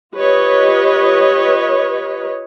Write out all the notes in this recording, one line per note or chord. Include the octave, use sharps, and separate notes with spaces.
F4 G4 B4 C#5 D#5